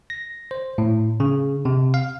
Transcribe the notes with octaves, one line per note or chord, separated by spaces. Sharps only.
A#6
C5
A2
C#3
C3
F5